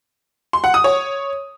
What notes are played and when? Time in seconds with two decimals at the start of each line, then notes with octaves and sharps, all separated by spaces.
0.53 C6
0.64 F#5
0.74 D#6
0.84 C#5